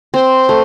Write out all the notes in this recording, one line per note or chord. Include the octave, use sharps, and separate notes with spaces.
C4 C5
A3